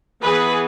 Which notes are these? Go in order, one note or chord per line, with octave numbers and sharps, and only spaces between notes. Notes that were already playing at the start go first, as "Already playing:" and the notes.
E3 B3 G#4 B4